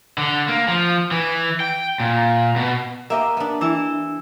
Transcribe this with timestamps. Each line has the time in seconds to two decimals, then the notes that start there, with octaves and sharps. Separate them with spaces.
0.18 D3
0.48 A#3
0.68 F3
1.11 E3
1.60 G5
2.00 A#2
2.56 B2
3.10 A#3 G4 D#5 E5
3.37 B3 D4
3.61 E3 E4 E6